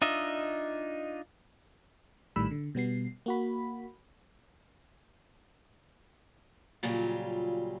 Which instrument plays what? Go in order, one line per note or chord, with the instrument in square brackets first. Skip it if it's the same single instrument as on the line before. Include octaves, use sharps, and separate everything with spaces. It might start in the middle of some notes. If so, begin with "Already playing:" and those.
[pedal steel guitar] D4 D#4 F4 D#5 E5
[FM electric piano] A#1 A2 D#3 G3 B5 E6
D3
B2 G3 B3 C7
A#3 F#4 B5
[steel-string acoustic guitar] A#2 C#3 F#3 G3 F4